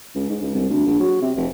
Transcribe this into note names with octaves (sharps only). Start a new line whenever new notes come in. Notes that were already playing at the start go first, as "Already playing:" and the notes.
C#2
G#2
C#2
C2
D2
A#1
F#3
C3
F1